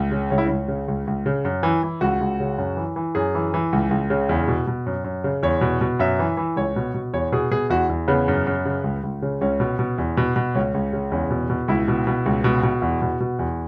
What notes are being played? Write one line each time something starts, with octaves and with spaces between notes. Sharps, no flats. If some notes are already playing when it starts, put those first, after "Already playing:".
Already playing: C#2
C#3
C#2 C#4
E4
C#2 C#4
C#3
C#2
C#2
C#3
F#2
E3
E3
C#2 F#4
C#2
C#3
F#2
E3
E3
F#2 G#4
E3
E3
C#2
C#2
C#3
E2
B2
B2
F#2
F#2
C#3
E2 C#5
B2
B2
F#2 E5
E3
E3
C#2 C#5
B2
B2
E2 C#5
B2 G#4
B2 G#4
E2 F#4
E2
C#3 B3
F#2
F#2
C#3
C#2
C#2
C#3
C#2 C#4
B2
B2
E2
B2
B2
C#2 C#4
C#2
C#3
E2 C#4
B2
B2
C#2 E4
B2
B2
C#2
B2
B2
E2 F#4
B2
B2
E2